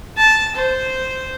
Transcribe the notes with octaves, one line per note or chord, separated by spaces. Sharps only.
A5
C5